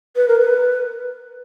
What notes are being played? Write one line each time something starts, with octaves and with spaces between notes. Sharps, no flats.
B4
A#4
B4